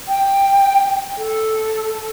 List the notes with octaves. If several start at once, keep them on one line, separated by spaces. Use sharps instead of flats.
G5
A4